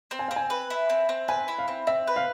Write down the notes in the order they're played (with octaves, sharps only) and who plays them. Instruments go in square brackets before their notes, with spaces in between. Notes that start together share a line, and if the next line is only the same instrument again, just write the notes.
[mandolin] C4
[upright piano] G#5
[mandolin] C4 [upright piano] F5
[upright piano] G#5
[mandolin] B4
E4
C4
C4
[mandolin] B4 [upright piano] G#5
[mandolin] E4
[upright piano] F5
[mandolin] C4
[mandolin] C4 [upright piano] E5
[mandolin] B4
[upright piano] F5